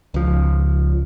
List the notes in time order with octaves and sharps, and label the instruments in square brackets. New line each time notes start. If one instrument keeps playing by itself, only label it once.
[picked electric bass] C#2 F3